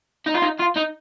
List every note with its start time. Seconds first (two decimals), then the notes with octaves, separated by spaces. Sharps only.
0.26 D#4
0.34 F4
0.42 D#4
0.59 F4
0.76 D#4